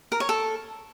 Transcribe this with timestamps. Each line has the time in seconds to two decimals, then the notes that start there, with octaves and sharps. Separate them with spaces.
0.12 A#4
0.20 C#5
0.29 A4